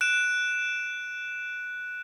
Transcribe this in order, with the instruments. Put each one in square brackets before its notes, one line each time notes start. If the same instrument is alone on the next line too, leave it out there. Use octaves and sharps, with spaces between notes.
[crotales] F#6 D7 E7